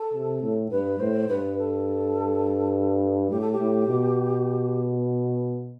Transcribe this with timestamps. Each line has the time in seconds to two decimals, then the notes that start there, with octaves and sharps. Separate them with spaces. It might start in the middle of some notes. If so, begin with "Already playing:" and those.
Already playing: A4
0.14 C3
0.42 A2
0.71 G2 B4
1.00 A2 C5
1.28 G2 B4
1.58 A4
3.30 A2 G4
3.41 A4
3.52 G4
3.59 A2
3.88 B2